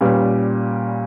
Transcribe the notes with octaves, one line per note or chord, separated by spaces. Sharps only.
A#2 G3 C#4 G4 B4